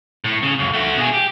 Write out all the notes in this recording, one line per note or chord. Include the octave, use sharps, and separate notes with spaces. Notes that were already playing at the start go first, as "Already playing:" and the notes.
A2
C#3
C#2 F#2
A3 F#4
B2 G#4
G4